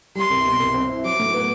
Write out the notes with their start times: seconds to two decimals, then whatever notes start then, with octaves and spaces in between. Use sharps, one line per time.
0.15 G3 C6
0.30 C2
0.45 B2
0.59 C2
0.74 C4
0.89 E4
1.04 F#3 D6
1.20 A2
1.34 B3